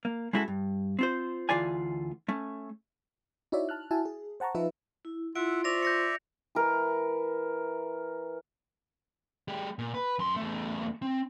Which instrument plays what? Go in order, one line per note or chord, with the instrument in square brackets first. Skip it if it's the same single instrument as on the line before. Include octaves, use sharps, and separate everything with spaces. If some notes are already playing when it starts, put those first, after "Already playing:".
[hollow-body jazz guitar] A#3
G#3 C#4 E4 F#4 G#4 A4
G2
C4 F4 C5
D2 E3 F4 G#4 D5 G#5
A3 C#4
[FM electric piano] D#4 E4 F#4 C#5 D5 E5
A5 F6 F#6
E4 F#4 E5 G#5 A5
G#4
C5 F#5 A5 A#5 C#6
F3 D#4 F4 B4 E5
[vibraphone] E4
[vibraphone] E4 [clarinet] F4 [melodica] E5 F#5 [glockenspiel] D7
[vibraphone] C5 C#6 [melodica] D5 E5 [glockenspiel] A#6 F7
[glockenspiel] G6 A#6 C#7
[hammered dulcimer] E3 A#4
[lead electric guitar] G#3 G4
A#2
B4
F#2 C6
E2 A3
C4